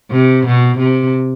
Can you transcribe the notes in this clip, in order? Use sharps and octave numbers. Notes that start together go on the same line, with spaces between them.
C3
B2
C3